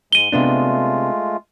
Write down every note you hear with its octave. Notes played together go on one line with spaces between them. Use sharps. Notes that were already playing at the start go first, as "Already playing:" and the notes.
G#2 G#3 D#7 G7
C3 G#3 A3 B3 D4 F4